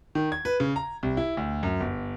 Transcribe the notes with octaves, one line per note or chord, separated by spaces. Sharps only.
D#3
G#6
B4
C#3
A#5
C2
E4
D2
F#2
G1